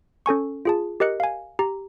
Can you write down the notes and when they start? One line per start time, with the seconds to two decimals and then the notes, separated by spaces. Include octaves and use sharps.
0.26 C#4 A4 G#5 C#6
0.65 F4 G#4 A5
1.00 G4 A#4 D#5 F#6 C#7
1.20 F5 G#5
1.59 G4 A#5